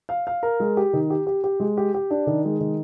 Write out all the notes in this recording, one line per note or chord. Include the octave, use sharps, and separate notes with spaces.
F5
F5
A#4
G#3
G4
D#3
G4
G4
G4
G#3
G4
G4
D4
D#3
G#3
D#3